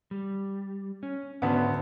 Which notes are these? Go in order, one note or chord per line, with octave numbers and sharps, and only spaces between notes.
G3
C#4
D2 G#2 B3 C#4